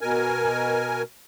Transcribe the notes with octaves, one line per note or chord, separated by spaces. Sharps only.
B2 A#4 G#5